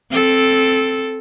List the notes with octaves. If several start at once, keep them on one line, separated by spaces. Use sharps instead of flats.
C4 A4